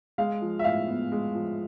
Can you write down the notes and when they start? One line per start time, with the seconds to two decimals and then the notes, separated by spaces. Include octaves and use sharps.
0.18 G#3 F5
0.42 F3
0.59 E5
0.64 A2 F5
0.87 B3
1.12 G#3
1.35 F3